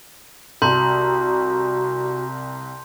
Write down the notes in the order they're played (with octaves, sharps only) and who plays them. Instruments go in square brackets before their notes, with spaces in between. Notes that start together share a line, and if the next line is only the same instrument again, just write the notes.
[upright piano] C2 [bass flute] F#4 [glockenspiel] A5 C6 G6